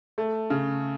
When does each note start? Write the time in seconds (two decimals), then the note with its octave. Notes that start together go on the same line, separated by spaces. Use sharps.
0.18 A3
0.50 C#3